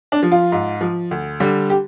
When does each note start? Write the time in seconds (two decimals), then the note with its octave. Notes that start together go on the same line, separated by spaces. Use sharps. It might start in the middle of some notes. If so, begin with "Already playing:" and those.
0.12 D4
0.23 F3
0.32 F4
0.52 G#2
0.81 F3
1.11 D2
1.40 D3 G3
1.70 G4